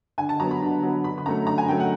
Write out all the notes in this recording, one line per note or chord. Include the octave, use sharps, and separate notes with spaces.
D3 G#5
A5
F#3 B3 A#5
B5
D3
F#3 B3
D3 B5
B5
F#3 A3 C#4 A#5
D3 A#5
G#5
F#3 A3 C#4 G5
F#5